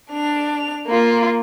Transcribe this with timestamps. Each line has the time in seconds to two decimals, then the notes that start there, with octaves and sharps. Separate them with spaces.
0.11 D4 F7
0.87 A#3 F4